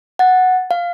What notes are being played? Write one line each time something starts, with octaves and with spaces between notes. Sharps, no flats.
F#5 A6
F5